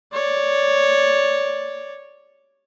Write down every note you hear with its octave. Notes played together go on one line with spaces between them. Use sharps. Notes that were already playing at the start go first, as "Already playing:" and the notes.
C#5 D5